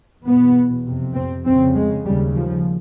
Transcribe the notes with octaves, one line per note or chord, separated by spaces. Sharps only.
E2 B2 B3
F2 C3
C4
F2 C#3 C4
G#3
D#2 C#3 G3
F3